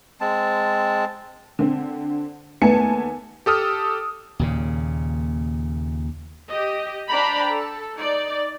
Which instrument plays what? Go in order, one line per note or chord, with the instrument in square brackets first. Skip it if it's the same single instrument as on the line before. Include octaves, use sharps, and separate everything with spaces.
[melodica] G#3 C4 A5
[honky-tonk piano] D3 C4
D#2 A3 B3 G#5 A5 C#7
[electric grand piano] G4 A4 D#6 F6
[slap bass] D#2 A#2 C#3
[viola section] G4 D#5
D4 C5 D5 G5 A#5 B5
A4
D#4 D5